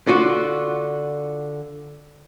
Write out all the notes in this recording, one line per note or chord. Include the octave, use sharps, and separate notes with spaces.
D3 F4 F#4